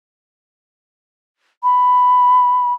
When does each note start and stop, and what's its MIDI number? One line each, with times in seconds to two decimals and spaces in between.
1.63 2.73 83